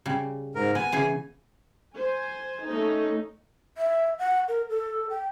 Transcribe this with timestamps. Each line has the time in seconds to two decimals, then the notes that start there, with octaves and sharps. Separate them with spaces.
0.06 C#3 G3
0.55 G#2 A#4
0.75 B3 G#5
0.92 C#3 E3 G#4
1.95 C5 G#5
2.67 A3 C#4 D#4
3.77 E5
4.19 F#5
4.48 A#4
4.70 A4
5.10 G5